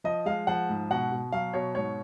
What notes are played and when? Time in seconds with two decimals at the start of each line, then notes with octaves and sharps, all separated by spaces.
0.04 F3 D#5
0.26 G#3 F5
0.47 F3 F#5
0.69 G#2
0.90 B2 F#5
1.11 B2
1.32 F#3 F5
1.54 B2 C#5
1.75 G#2 C#5